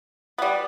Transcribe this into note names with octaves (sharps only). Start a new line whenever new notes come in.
G3 B3